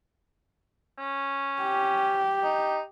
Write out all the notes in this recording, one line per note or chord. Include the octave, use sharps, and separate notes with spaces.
C#4
G4
D#4